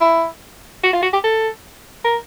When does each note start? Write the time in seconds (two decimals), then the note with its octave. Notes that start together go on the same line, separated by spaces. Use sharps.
0.01 E4
0.83 F#4
0.93 F4
1.03 F#4
1.13 G4
1.24 A4
2.05 A#4